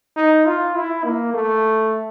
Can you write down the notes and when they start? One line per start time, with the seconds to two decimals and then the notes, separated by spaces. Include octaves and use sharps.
0.16 D#4
0.46 F4
0.75 E4
1.04 A#3
1.34 A3